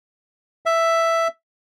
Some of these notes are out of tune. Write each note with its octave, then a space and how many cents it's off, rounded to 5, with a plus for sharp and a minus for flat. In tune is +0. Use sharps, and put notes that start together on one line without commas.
E5 +5